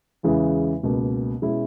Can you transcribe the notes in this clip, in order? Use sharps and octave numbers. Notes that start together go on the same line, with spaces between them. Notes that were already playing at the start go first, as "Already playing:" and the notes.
E2 C#3 E3 G#3
C#2 B2 A#3
B2 G#3 C#4 E4